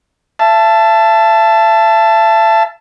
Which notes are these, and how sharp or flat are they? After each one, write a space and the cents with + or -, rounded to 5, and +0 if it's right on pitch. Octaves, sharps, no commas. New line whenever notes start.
E5 +40 A5 +0